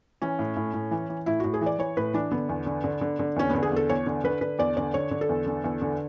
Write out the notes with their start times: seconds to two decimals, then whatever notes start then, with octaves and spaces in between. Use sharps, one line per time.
0.22 E3 C#4
0.39 A2
0.57 A2
0.74 A2
0.91 E3
1.09 E3
1.26 A2 E4
1.40 A2 F#4
1.54 G#4
1.61 E3
1.66 D5
1.79 E3 C#5
1.97 A2 B4
2.14 E3 D4
2.31 D3 B3
2.49 E2
2.66 D3
2.84 D3
3.01 D3
3.19 D3
3.36 E2 C#4
3.50 B3
3.55 D3
3.63 G#4
3.72 E2 A4
3.89 E2 C#5
4.06 D3
4.24 D3 B4
4.41 D3 B4
4.59 E2 D5
4.77 D3 D5
4.94 D3 C#5
5.11 D3
5.21 A4
5.29 E2
5.46 D3
5.64 E2
5.82 D3